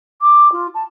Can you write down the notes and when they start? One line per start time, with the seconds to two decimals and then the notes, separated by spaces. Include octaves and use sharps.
0.21 D6
0.52 F4
0.74 A5